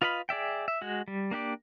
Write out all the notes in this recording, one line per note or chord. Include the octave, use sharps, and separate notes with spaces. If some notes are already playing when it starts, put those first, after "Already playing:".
F4 B4 D#5 F5 B5
G#4 D5 E5 G5
E5
G#3 F#4
G3
A#3 D4 G4 D5